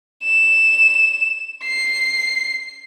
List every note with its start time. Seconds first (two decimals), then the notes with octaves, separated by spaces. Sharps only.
0.24 E7
1.64 C7